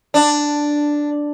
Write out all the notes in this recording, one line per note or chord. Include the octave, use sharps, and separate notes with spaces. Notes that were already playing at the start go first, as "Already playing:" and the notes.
D4